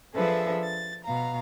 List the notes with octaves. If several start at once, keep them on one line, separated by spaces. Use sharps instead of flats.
F3 D4 G#4 A4 B4 E5
A6
B2 F5 A#5